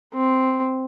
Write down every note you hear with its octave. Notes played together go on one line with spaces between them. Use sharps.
C4